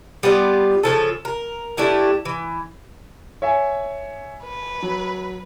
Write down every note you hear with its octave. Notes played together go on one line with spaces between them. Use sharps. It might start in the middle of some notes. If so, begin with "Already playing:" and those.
G3 B3 F4 D5
C#3 F3 A4
A#4
A3 D4 E4 G4
E3
C#5 E5 G#5
B4
F#3